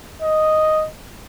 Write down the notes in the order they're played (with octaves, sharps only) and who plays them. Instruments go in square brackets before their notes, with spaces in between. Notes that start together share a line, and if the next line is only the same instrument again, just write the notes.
[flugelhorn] D#5